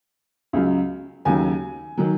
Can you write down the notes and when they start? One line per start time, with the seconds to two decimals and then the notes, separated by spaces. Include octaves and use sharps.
0.53 C#2 C#3 F#3
1.25 D#2 C#3 F#3 G#5
1.98 D#3 F#3